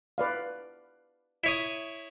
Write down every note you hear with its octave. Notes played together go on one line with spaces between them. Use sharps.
B4 D5 F5
E4 C#5 D#6